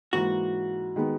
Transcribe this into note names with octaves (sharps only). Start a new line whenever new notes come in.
G#2 E3 A#3 F#4
D#3 G#3 B3